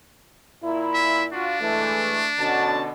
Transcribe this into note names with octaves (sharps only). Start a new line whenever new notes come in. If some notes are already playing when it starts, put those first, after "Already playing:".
A#2 E4
E5
D4 F4 F#4
E3 G#3 A3
B2 D3 C#4 F#4 A5